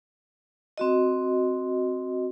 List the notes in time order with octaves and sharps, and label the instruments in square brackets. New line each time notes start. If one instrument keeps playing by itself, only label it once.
[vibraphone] C4 F#4 D#5